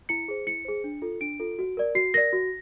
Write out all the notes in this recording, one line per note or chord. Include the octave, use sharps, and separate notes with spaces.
E4 C#7
G#4 C5
E4 C#7
G#4 C5
D4
F4 A4
D4 D7
F4 A4
F#4
A#4 D5
F#4 C7
A#4 D5 A#6
F#4